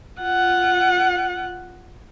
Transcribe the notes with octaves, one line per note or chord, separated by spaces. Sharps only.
F4 F#5